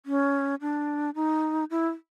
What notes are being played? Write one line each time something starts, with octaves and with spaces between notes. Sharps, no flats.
C#4
D4
D#4
E4